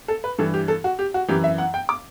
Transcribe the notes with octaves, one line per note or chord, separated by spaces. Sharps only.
A4
B4
G2 E3 A4
G4
A4
F#4
G4
F#4
F#2 E3 G4
E5
F#5
G5
D6